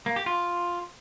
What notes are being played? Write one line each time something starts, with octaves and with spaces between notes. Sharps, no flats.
A#3
G4
F4